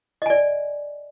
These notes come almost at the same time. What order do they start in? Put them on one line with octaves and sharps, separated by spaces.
D#5 G#5 D5